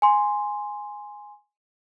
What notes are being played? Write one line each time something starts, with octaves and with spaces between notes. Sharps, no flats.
G#5 C6